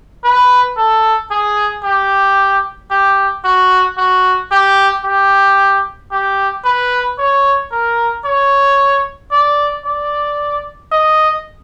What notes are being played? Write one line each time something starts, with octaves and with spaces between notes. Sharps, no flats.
B4
A4
G#4
G4
G4
F#4
F#4
G4
G4
G4
B4
C#5
A#4
C#5
D5
D5
D#5